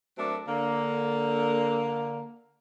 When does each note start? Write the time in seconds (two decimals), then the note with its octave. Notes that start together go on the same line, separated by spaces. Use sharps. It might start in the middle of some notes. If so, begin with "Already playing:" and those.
0.18 F#3 A3 C4 D4 A4 A#4
0.47 D3 A#3